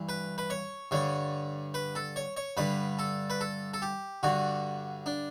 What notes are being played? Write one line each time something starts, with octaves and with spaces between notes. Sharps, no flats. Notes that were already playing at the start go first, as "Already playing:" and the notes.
Already playing: G2 E3
B4
B4
C#5
G2 D3 C#5
B4
A4
C#5
C#5
G2 D3 B4
A4
B4
A4
A4
G4
G2 D3 F#4
D4